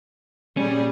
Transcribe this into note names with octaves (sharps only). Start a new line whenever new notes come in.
A#2 G3 C#4 G#4